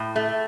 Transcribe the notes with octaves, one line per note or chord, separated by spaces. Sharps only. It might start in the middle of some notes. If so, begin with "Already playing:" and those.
Already playing: A2
A3